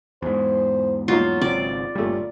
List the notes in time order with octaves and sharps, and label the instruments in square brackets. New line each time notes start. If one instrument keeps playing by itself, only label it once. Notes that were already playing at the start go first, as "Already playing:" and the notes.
[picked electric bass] E2 G#2 [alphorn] C5
[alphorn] F#3 [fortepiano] A#3 D#4 F#4 [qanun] F4
[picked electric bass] G#1 C#3 C4 [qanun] D5
[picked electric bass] G1 G3 [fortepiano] A#2 A3 [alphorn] C#3